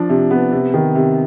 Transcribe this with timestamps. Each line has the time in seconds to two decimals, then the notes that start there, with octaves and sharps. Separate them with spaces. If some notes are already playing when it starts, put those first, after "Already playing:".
Already playing: F3 D4
0.09 C3
0.31 B3
0.52 C3
0.74 D#3
0.95 C3